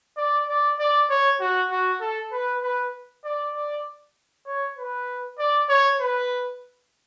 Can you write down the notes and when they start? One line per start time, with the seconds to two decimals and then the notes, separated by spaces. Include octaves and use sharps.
0.17 D5
0.48 D5
0.79 D5
1.10 C#5
1.40 F#4
1.71 F#4
2.01 A4
2.32 B4
2.62 B4
3.24 D5
3.55 D5
4.46 C#5
4.77 B4
5.39 D5
5.69 C#5
6.00 B4